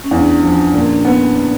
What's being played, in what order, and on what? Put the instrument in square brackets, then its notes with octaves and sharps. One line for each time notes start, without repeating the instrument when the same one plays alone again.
[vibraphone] C#4
[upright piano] E2 [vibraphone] D4
[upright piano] F3
A#2
B3